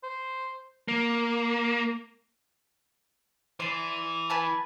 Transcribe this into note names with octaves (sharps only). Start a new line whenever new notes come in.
C5
A#3
E3 D5 C6
B4 G#5 A5